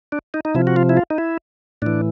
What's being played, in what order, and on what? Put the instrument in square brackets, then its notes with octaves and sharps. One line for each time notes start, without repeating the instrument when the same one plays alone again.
[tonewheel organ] D4
D#4
D#4
C3 F3 E4
F#4
F4
E4
F4
D#4
E4
A2 E3 D4